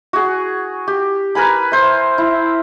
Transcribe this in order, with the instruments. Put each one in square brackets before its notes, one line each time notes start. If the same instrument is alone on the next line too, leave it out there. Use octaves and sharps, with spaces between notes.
[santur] F#4 G#4
G4
A#4 B4 G#5 B5
C5 E5
E4